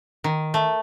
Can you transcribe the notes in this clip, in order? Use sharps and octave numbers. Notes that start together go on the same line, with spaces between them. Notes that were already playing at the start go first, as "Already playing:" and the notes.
D#3
A3